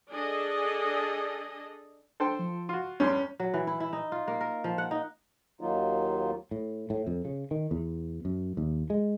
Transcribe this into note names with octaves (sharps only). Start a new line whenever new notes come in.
D4 G#4 A4 D#5
D4 A4 C5 G5
F3
F4 F#4
E2 G2 C#4 C6 G6
F#3
E3
E4
E4
D#4
F4
A#3
A#4
F3
F#5
D#4
D#2 D#3 F#3 A#3 D#4 F4
A2
A2
F2
C#3
D#3
E2
F#2
D#2
G#3